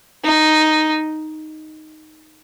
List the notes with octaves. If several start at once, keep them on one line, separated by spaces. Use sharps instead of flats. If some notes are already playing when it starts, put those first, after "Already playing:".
D#4